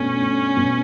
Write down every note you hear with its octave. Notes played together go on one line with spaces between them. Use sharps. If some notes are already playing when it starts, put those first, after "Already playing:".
Already playing: B2 A3 C#4 D4
A3 D4
B2